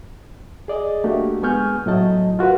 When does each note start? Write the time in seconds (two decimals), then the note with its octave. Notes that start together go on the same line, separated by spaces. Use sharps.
0.68 G#4 D5 D#5
1.04 A3 A#3 D4 F#4 G4
1.42 G#3 B3 G#5 C#6 F6 G6
1.86 A2 F#3 A3 E4 D#5 A5
2.39 F4 F#4 A#4 B4